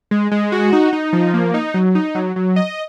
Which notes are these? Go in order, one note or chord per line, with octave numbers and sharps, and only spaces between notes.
G#3
G#3
F#4
D#4
D#4
F3
A#3
D#4
F#3
D#4
F#3
F#3
D#5